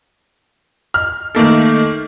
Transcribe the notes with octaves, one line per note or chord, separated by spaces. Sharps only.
F6
D#3 A3 A#3 A4